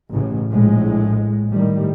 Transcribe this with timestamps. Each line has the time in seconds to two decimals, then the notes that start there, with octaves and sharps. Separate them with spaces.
0.11 A1 A2 C#3
0.52 A#1 A2 G#3
1.51 A2 D#3 G3